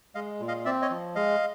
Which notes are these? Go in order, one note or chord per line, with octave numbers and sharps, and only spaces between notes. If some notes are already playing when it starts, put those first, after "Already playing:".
G#3 D#5 F5
A#2
D#5 F5
C4 D5 E5
C#5 D#5
F3
G#3 D#5 F5